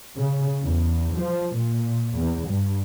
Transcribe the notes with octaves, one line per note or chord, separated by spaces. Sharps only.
C#3
E2
F3
A#2
E2
G2